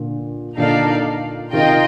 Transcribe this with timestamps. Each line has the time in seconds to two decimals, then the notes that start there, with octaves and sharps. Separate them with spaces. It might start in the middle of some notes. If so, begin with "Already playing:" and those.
Already playing: A#2 D3
0.57 A#2 D3 D#4 A4 D5 F5
1.52 C3 D#3 F4 A#4 D#5 G5